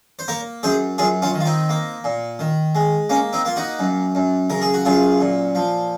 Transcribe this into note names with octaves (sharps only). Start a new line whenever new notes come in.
C5
A#3 A#4 C#5
F#2 G#4 C5
F#2 F4 G#4
C#4 F4
D#3
F4
C4 D#4
A#3
A#2
D#3
G#3
A#3 C#4
C4 D#4
A#3 F4
D#4 F#4
F#2
F#2
C#3 A#4
G#4
F#4
F#2 F4 G#4
A#2
F3